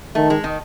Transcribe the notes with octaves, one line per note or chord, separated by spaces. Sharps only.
D#3 A3
G#3
D#3